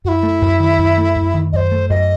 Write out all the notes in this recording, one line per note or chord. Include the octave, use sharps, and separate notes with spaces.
F#2 E4 F#4
A3
F#2
D#3
F#2
A3
F#2
D#3
F#2 C5 D#5
A3
F#2 D#5